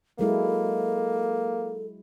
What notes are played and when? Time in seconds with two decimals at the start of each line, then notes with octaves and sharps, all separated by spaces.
0.19 F#3 G#3 A#3 E4 A4